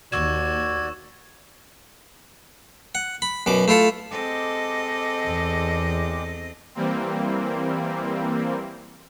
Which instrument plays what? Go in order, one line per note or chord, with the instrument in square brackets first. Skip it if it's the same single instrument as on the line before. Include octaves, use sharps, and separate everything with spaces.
[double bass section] D#2 [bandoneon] F#4 D5 [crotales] C#6 E6 E7 [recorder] G#6
[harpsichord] F#5
B5
F#2 B2 D6
A3 E4 F4 A4
[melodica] G#3 G4 D6 [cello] C4 D#5 [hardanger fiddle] A4
[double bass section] E2
[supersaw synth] E3 G3 A#3 C4